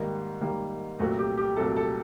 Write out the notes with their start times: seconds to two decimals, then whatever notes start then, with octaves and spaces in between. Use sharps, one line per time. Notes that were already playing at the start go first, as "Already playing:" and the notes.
Already playing: G#2 D#3 G3 A#3
0.41 G#2 D#3 G3 A#3
0.99 C2 A#2 F#3 A3 C4 F#4
1.19 G4
1.38 G4
1.56 C2 A#2 F#3 A3 C4 A4
1.76 A4